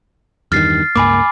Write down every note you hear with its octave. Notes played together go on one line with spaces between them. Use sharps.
E2 G2 D#3 F6 A6 C7
C#2 G2 A#3 G#5 B5 D6